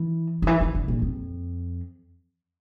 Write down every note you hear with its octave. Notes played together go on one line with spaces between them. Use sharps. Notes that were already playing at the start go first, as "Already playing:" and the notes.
Already playing: E3
D#3
E3
D#3
D3
A#2
F2